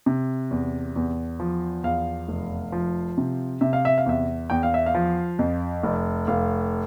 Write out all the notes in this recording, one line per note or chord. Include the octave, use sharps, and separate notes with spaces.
C3
E2
E2
F3
E2 F5
F1
F3
C3
C3 E5
F5
E5
F5
E2 E5
E2 G5
F5
E5
F5
F3
F2
F1
F1 F5